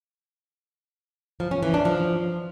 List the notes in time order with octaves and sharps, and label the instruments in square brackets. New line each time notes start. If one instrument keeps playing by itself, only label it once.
[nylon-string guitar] F3
C#4
E3
D4
F3